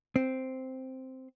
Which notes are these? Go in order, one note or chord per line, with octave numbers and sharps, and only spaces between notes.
C4